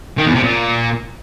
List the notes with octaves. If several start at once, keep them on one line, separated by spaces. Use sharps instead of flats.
D#3
E2
C3
A#2